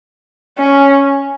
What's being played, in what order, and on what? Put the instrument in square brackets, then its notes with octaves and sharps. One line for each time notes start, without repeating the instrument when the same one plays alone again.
[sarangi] C#4